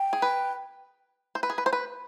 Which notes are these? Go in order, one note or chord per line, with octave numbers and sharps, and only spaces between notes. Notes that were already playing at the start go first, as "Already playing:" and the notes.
Already playing: G5
G#4
B4
C5
B4
G#4
B4
C5
B4